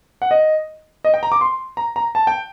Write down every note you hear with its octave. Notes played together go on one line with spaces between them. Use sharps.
F#5
D#5
D#5
G5
A#5
D6
C6
A#5
A#5
A5
G5